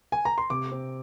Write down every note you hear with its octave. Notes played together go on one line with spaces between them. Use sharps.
G#5
A#5
C6
C3 D6
C4